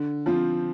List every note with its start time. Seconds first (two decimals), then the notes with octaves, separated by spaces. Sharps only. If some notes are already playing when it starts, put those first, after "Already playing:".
Already playing: D3
0.26 F3 C4 F4